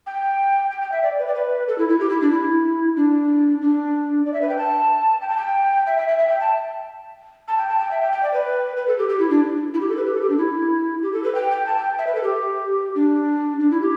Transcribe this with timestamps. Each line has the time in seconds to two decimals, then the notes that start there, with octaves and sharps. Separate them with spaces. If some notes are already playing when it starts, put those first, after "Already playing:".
0.06 G5
0.71 G5
0.82 G5
0.92 E5
1.03 D5
1.19 B4
1.28 D5
1.35 B4
1.68 A4
1.78 E4
1.89 E4
2.00 G4
2.10 E4
2.21 D4
2.31 E4
2.96 D4
3.61 D4
4.25 D5
4.34 E5
4.41 B4
4.49 G5
4.58 A5
5.21 G5
5.30 A5
5.37 G5
5.86 E5
5.98 E5
6.08 E5
6.19 E5
6.29 G5
6.40 A5
7.48 A5
7.58 G5
7.69 A5
7.79 G5
7.91 E5
8.01 G5
8.12 G5
8.23 D5
8.33 B4
8.76 B4
8.88 A4
8.98 G4
9.09 G4
9.19 E4
9.30 D4
9.74 E4
9.81 G4
9.89 A4
9.97 B4
10.06 G4
10.14 A4
10.22 G4
10.30 D4
10.38 E4
11.02 G4
11.13 A4
11.24 B4
11.35 G5
11.51 G5
11.66 A5
11.77 G5
11.98 E5
12.07 B4
12.15 A4
12.23 G4
12.95 D4
13.60 D4
13.71 E4
13.81 G4